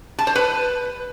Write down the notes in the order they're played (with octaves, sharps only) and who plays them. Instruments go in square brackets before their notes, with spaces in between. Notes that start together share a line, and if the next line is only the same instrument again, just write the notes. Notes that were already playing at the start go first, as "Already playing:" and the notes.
[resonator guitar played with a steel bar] A5
C5
B4